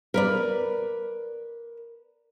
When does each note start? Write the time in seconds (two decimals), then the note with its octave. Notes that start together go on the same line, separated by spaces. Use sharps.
0.14 A#4 B4 D5